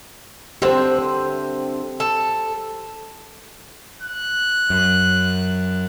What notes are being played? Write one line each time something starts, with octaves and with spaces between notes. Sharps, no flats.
D3 C4 G4 C5 E5
C5
A4
F#6
F#2